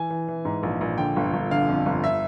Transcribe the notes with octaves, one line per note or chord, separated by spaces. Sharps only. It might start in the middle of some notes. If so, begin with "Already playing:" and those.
Already playing: E3 G#5
E3
E3
G#2
A#1
A#1
D3 G5
G1
G1
D3 F5
F2
G1
E5